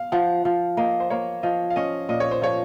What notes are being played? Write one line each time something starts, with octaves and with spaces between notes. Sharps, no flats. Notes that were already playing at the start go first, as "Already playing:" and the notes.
Already playing: F5
F3 F#5
F3
A#3 D#5
C5
A#3 C#5
F3 D#5
F5
C#4 D#5
A#2 D#5
C#5
C5
F3 C#5